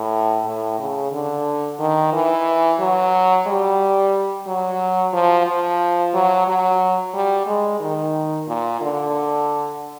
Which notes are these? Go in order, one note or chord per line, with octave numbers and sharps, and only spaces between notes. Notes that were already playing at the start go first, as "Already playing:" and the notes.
Already playing: A2
A2
C#3
D3
D#3
E3
F#3
G3
F#3
F3
F3
F#3
F#3
G3
G#3
D#3
A#2
D3